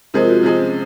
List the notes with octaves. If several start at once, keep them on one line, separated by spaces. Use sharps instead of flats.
C3 F3 G#3 A#4
F4
F#4
C3 F3 G#3 F4
C#4